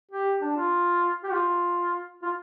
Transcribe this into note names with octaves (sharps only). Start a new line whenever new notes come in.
G4
D4
F4
G4
F4
F4